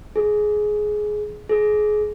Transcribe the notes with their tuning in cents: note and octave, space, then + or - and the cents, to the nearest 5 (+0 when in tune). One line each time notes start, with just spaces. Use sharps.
G#4 +15
G#4 +25